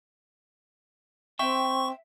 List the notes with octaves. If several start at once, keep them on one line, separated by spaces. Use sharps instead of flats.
C4 E5 G5 C#6